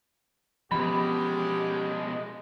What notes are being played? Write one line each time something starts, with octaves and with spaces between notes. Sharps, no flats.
B2 F3 G#3 B3 C#4 G4 B5